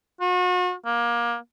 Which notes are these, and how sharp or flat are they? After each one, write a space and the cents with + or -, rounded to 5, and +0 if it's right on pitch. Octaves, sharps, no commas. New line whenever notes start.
F#4 -40
A#3 +25